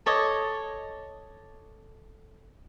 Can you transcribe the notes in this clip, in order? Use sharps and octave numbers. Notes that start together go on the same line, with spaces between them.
A4 C#5 D#5 D6